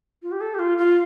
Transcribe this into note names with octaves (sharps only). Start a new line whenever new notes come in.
F4
G4
A4
G4
F4
F4